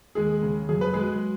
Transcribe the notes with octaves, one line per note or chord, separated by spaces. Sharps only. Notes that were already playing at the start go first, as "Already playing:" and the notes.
D#2 G#3 G#4
C#3
F#2 G#4
B4
F#3 G#3 G#4